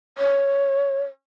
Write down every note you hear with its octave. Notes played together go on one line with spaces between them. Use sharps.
C#5